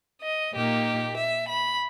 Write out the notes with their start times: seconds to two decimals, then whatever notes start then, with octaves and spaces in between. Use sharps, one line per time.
0.22 D#5
0.53 A#2 A#3 D#4 G4
1.16 E5
1.48 B5